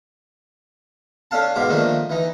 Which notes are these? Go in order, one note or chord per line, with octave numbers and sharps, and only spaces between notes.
C#4 D4 A4 F5 A5
G#2 B2 F5 D6
D#3 F3 A3 A#3 D4 D#4
E3 D#4